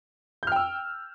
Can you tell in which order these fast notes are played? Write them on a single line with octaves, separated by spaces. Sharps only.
G6 F6 G5 E6